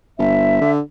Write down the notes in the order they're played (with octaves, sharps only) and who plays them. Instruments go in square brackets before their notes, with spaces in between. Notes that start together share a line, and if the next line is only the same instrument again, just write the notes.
[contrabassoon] G1 [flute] E5
[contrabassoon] D3